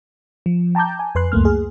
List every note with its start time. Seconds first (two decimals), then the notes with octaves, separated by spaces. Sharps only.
0.46 F3
0.75 G5 A5 A#5 D6 G6
0.99 G#5
1.15 F2 B4 C6 F#6
1.32 C#2 F#2 A3 A#3 F6
1.45 G#4